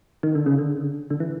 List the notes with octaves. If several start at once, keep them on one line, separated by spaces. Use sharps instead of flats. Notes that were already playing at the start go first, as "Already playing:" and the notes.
D#3
D3
C#3
D3
D3
E3